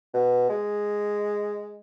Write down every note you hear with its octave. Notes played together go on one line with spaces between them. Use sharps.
B2
G#3